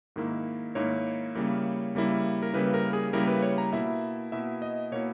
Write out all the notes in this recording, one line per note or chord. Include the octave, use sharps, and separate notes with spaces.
G#2 D#3 A#3 E4
G#2 D#3 A#3 E4 C#5
C#3 G3 A#3 E4
C#3 G3 A#3 E4
A#4
C#3 G3 A#3 E4 B4
A#4
G#4
C#3 G3 A#3 E4 A#4
B4
C#5
A#5
B2 A#3 E4 E5
B2 A#3 E4 E5
D#5
B2 A#3 E4 C#5